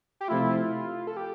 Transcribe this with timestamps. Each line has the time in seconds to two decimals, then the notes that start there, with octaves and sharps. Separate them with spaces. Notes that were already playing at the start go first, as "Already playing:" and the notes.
0.21 G4
0.28 C3 F3 A3 E4 F4
1.07 A4
1.17 G4